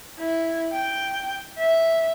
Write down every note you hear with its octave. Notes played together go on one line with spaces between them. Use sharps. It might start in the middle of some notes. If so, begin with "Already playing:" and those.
E4
G5
E5